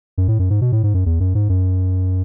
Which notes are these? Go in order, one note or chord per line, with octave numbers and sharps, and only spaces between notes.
F#2
A2
F#2
G#2
B2
A2
G#2
F#2
E2
F#2
G#2
F#2